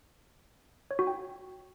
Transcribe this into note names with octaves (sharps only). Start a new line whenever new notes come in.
C#5
F#4
G5